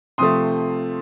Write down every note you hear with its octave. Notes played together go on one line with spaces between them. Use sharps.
C3 F3 A3 C6 D#6